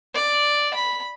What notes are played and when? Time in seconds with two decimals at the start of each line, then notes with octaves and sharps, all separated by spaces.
0.14 D5
0.74 B5